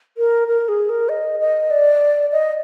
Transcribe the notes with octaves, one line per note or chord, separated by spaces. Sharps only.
A#4
A#4
G#4
A#4
D#5
D#5
D5
D#5